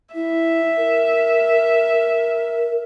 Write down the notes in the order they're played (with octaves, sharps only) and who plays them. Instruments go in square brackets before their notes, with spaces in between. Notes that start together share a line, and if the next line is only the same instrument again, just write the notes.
[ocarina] E4 [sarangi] E5
[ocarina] A#4